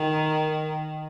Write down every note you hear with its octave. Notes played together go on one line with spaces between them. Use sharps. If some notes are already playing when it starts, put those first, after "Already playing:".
Already playing: D#3